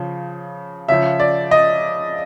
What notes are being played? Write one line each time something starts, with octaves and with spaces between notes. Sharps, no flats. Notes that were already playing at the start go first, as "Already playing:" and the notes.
Already playing: C#3 F3
C#3 F3 E5
D5
D#5